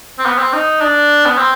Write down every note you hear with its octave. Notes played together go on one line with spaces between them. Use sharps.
C4
B3
C4
D#4
D4
B3
C4